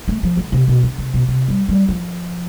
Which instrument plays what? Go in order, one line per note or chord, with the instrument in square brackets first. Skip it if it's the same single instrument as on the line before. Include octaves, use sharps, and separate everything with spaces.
[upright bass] A3
F3
D3
C3
B2
D3
C3
B2
C3
G3
G3
F3